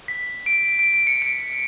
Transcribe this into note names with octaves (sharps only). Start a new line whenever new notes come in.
B6
D7
D7
D7
D7
C#7
D7